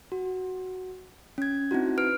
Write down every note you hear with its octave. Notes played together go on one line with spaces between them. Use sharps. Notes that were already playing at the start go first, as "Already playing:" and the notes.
F#4
C#4 G#6
C4 D#4 E4 F#4
B4 F6 D7